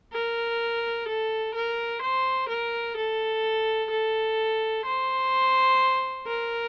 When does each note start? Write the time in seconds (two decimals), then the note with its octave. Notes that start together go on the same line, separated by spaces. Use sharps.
0.13 A#4
1.08 A4
1.55 A#4
2.02 C5
2.49 A#4
2.97 A4
3.91 A4
4.85 C5
6.27 A#4